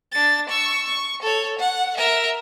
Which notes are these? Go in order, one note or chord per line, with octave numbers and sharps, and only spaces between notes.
D4 A6
C#6 E6
C#6
A4 C#5
F#5
A#4 E5